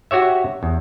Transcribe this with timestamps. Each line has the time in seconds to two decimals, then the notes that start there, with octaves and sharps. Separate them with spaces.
0.11 F#4 G4 C#5 E5
0.63 E2